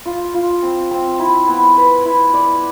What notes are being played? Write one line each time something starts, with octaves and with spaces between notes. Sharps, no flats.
F4
F4
C4
C4
E4
B3
B4
E4
D5